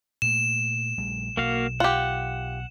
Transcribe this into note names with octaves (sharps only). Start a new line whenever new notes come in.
A#2 A3 E7
A#1 G3 A3
B1 A#3 F#4 F5
F4 G4 F#5